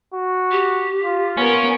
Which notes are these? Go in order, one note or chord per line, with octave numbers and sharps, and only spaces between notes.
F#4
G4
F4
B3 C#4 A#4